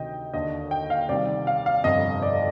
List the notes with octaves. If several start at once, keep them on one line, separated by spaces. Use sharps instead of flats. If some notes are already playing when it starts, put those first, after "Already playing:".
Already playing: D2 C3 D#3 D#5 G5
D#2 D3 D#5
G5
F5
C2 C3 D#3 D5
F5
F5
G1 F2 C3 D#5
D5